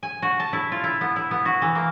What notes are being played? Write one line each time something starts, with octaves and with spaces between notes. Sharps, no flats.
G#5
F#4
A5
E4
F4
E4
B3
E4
B3
F#4
E3
A#3